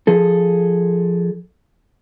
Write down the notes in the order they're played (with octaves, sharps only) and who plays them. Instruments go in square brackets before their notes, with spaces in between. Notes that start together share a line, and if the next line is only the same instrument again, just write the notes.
[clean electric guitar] F3 G#4 A4